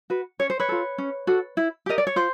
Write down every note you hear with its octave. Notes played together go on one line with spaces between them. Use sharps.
F#4 B4
C#4 C#5
C5
B4 C#5
F4 A4
C#4
F#4 A4
E4
G4 A#4 D#5
D5
C#5
F4 C5